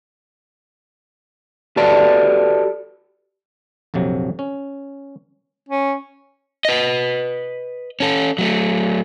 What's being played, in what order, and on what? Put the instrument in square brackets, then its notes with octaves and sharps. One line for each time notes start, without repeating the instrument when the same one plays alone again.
[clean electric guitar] F#4 G4 A4 B4 D5 A5
[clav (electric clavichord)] A#1 F2 C3 F#3
C#4
[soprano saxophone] C#4
[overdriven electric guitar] B4 D#5
C#4 A4
F#3 A3